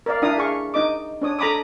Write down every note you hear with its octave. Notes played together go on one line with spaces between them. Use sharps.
A#4 D5 F5
D4 E4 F5 A#5 D#6
G#4 F5 C#6
D#4 D#5 D6
D4 C#5 D#6
A4 A#5 B5 D6 D#6